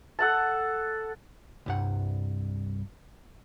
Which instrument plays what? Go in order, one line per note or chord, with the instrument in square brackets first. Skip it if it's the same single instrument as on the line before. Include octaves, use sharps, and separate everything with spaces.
[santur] A4 F#5 A5
[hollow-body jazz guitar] C2 G2 F#5